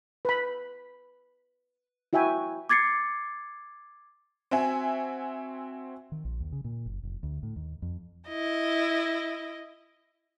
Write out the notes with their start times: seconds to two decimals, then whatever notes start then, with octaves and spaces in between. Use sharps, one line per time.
0.25 B4 B5
2.13 E4 F#4 E5 G5 G#5
2.69 D6 G#6 A6 C7 C#7
4.51 C4 F#4 E5 G#5
6.12 D#3
6.25 A#1
6.40 D#2
6.52 C#3
6.64 A#2
6.86 F#1
7.03 F1
7.23 D2
7.43 A2
7.56 D#2
7.82 F2
8.28 E4 D#5